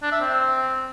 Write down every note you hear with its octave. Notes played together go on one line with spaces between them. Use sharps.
D4
E5
C4